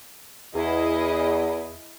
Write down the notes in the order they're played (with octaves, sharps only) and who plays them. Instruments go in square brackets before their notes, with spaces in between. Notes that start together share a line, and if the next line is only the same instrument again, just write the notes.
[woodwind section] E2 [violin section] E4 G#4 D#5